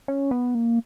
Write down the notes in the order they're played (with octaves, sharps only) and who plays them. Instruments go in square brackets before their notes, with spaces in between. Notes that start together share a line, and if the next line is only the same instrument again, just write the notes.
[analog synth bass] C#4
B3
A#3